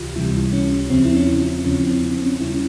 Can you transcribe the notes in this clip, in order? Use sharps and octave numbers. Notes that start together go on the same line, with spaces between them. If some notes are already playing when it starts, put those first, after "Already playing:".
Already playing: C#2 C3 E3 F4 G4
C#2 C3 E3 G3 E4
C#4
E2 C#3 F3 C4
E4
C#4
F4
E2 C#3 F3 C#4
C4
C4
C#4
E2 C#3 G3 E4
C#4